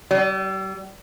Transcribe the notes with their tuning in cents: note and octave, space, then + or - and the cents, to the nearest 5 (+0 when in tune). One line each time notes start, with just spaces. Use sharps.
G3 -40